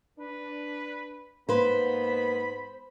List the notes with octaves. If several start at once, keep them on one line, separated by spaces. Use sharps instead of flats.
D4 B4
G#2 A#3 B3 B4 C5 B5